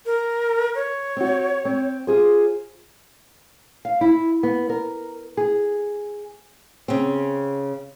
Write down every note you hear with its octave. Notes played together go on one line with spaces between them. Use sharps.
A#4
C#5
C4 F#4
C4
F4 G#4 C5
F5
E4
B3
A#4
G#4
C#3 C4